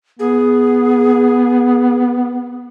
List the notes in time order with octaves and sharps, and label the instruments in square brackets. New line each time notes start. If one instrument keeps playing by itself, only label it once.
[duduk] B3 [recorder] G#4